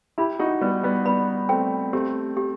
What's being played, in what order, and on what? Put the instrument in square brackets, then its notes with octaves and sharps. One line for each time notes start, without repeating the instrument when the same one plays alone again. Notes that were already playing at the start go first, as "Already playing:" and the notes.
[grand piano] E4 G4 [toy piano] B5
[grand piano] D#4 F#4
[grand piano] G3 B3 [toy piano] B4
[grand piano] G3 B3
[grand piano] G3 B3 [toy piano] B5
[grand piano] A3 C4 [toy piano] G5
[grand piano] A3 C4 [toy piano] G4
[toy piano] G4